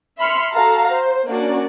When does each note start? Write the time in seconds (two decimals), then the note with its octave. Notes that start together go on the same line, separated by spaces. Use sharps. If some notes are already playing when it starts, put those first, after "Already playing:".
0.18 E5 B5 C6 F6 C#7
0.52 F#4 A4 F5 A#5
0.92 C5
1.28 A#3 C#4 D4 F#4 D5